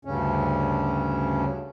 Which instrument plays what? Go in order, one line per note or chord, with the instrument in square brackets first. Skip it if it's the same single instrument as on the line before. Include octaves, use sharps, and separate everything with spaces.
[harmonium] D2 G2 C#3 C#4